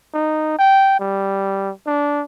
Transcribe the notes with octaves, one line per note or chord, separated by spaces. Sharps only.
D#4
G5
G3
D4